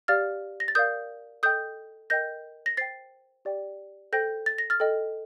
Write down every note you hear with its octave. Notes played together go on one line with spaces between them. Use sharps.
G4 D5 F5 F6 A6
A#6
A6
A#4 D5 F5 D#6 G6
A4 D#5 G5 D#6 G6
A#4 D#5 G5 G6 A#6
A#6
C5 G5 A6 C7
G4 D5 G5
A4 C5 G5 G6 A#6
A6
A#6
F6 A6
A4 D#5 G5